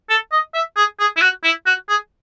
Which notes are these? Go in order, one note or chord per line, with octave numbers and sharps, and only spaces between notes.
A4
D#5
E5
G#4
G#4
E4
F#4
E4
F#4
G#4